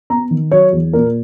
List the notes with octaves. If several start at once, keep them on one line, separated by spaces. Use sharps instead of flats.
B3 A#5
D#3
F#3 C#5
E2
A#2 A#4